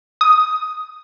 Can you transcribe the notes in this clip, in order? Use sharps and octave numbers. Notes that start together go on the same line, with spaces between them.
D#6